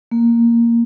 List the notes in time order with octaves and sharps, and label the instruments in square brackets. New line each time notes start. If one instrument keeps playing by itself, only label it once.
[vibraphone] A#3